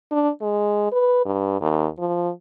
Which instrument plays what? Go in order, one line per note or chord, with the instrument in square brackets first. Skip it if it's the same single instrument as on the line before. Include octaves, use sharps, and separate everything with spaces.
[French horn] D4
G#3
B4
G2
D#2
F3